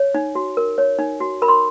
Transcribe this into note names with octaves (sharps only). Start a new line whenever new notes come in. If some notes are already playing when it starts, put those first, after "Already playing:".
Already playing: C#5
D#4
F#4
A#4
C#5
D#4
F#4
A#4 B5
C6